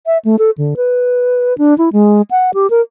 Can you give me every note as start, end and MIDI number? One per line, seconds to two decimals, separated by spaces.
0.06 0.18 76
0.25 0.36 57
0.39 0.51 69
0.58 0.74 50
0.77 1.56 71
1.58 1.77 62
1.78 1.89 64
1.93 2.22 56
2.31 2.51 78
2.54 2.69 67
2.70 2.81 70